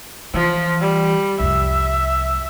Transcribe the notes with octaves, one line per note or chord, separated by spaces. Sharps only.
E3 F3
G3
C2 F2 E5